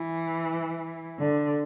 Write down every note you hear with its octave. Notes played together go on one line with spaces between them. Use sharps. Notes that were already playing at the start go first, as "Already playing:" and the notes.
Already playing: E3
D3